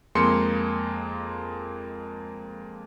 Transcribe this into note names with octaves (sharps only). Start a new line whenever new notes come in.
F2 G#3 A#3 C6 C#7